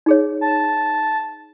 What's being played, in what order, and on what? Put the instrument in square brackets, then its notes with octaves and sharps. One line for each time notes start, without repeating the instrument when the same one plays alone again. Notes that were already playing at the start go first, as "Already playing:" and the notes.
[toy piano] D#4 G#4 C#5
[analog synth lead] A5